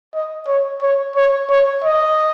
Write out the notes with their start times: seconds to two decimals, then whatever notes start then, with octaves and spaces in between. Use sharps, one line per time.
0.14 D#5
0.47 C#5
0.82 C#5
1.16 C#5
1.50 C#5
1.84 D#5